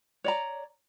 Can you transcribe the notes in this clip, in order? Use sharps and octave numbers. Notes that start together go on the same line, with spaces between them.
C#5 D5 A#5